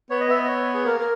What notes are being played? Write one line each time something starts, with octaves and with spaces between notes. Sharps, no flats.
B3 C#5
D#5
B3 E5
D#5
C#5
G#4
A#3 A#4
A#3